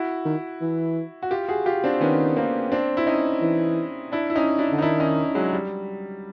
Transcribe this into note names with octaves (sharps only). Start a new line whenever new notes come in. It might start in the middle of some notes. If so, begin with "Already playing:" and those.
Already playing: E4 F#4
D#3
E3
F#4
F4 G4
F#4 G#4
F4 G4
C4 D4
D#3 B3 C#4
A#3 C4
C4 D4
E4
C#4 D#4
E3
D4 E4
E4
C#4 D#4
D4 E4
D3
D#4
D#3 D4 E4
C#4 D#4
F#3 G#3
G3